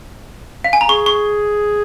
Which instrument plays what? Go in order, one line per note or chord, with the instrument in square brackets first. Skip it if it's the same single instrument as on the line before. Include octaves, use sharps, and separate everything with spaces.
[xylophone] F5
G#5
A#5
[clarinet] G#4 [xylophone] C#6
[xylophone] C#6